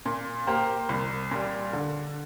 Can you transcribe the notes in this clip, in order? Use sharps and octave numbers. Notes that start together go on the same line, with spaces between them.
A#2
A#3 G4 C5
C2
A#2 G3
D3